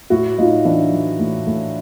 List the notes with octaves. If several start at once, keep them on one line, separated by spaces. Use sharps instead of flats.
A2 E4 F#4
A2 D#4 F4
E3 D4 E4
E3
A2
A2